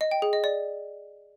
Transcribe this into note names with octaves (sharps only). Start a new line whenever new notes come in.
D#5
G5
G#4
D#5
D5